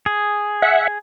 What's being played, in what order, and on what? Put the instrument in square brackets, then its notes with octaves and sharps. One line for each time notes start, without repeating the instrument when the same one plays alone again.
[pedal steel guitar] G#4
[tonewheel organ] E5 F#5